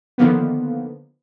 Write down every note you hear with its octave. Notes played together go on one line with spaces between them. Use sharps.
D3 D#3 F3 A#3 B3